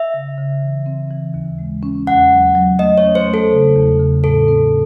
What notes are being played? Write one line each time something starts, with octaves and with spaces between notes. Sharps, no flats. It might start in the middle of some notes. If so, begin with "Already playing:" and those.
Already playing: E5
C#3
C#3
E3
C4
E3
D#2
G#3
C#4
E2 F#5
F#3
F#3
A3 D#5
C#5
C#4
C5
A3
A4
C#3
E2
C#3
A2 A4
C4